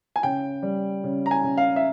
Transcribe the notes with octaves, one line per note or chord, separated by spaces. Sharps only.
G#5
C#3 G5
G3
C#3
A#5
G#5
C#3
F5
E5